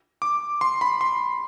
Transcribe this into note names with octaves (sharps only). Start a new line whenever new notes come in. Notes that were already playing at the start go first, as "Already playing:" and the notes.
D6
C6
B5
C6